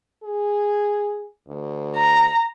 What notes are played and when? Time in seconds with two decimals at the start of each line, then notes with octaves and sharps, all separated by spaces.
0.23 G#4
1.47 D2
1.96 A#5